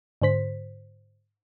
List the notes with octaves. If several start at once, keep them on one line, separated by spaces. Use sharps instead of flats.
G#2 D3 C5 B6